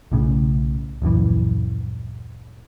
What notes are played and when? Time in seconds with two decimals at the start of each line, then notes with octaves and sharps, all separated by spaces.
0.12 B1 A2 C#3
1.02 D1 A#1 F#2 E3